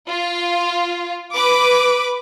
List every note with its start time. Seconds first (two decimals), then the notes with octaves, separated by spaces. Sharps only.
0.10 F4
1.34 B4 D6